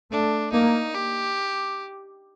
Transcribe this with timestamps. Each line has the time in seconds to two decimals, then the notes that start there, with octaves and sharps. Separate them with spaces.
0.10 A3 D4
0.52 A#3 D#4
0.95 G4